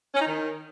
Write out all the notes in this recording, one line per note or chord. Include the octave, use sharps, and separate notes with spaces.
C#4
D#4
D#3